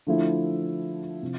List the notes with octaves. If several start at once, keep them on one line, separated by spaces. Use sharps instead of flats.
D3 F3 A3 E4
C3 F3